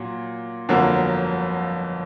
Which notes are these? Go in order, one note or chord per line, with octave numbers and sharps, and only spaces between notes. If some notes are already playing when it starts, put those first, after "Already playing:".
Already playing: A#2 F#3
G1 F2 D3 F#3 A#3